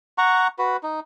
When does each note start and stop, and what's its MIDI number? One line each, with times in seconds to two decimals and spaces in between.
0.18 0.47 78
0.18 0.47 82
0.18 0.47 85
0.59 0.77 66
0.59 0.77 71
0.83 1.00 63